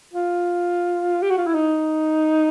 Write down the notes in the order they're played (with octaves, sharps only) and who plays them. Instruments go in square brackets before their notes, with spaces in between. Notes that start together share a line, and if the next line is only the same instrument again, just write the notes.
[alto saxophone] F4
G4
F#4
F4
E4
D#4